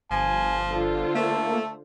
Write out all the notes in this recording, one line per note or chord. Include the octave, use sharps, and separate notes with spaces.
G1 F3 G#5
D3 F4 A4 C5
A3 A#3